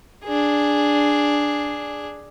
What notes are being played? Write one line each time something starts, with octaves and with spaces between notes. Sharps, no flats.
D4 G#4